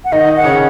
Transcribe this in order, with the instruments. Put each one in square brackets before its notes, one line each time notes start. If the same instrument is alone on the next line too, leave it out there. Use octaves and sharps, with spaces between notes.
[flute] F#5
[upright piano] D#3 D#4 [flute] D#5
[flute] F#5
[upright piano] C#3 C#4